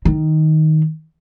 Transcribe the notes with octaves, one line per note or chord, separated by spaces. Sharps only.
D#3